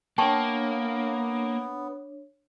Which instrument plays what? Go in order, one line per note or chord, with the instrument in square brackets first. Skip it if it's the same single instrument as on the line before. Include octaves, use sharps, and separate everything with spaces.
[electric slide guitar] A#3 [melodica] B3 [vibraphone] D4 C#5 [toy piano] G5 A5 C#6